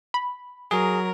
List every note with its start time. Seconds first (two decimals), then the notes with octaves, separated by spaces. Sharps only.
0.14 B5
0.71 F#3 G#4 A#4